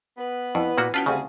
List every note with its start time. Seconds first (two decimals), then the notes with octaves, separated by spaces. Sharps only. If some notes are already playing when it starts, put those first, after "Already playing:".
0.18 B3 B4
0.55 F2 E4
0.78 A#2 A#3 F#4
0.94 B2 B3 C#4 F4 B4 G5 A5
1.06 D2 C#3 G3 C4 G#4 F5 G#5